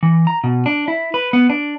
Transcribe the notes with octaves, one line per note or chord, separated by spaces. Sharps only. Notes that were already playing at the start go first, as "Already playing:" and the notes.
E3
A#5
B2
D4
E4
B4
B3
D4